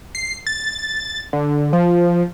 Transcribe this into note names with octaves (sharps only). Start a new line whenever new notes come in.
C7
A6
D3
F3